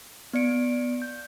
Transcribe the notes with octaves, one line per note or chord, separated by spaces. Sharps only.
B3 D5 C#7 D7
G6